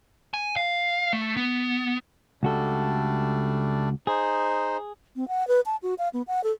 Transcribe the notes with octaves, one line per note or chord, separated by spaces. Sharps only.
G#5
F5
A3
B3
C#2 G3 A3 D4 F#4 A4
D#4 G#4 C5
C4
F#5
B4
A5
F#4
F5
B3
F#5
A4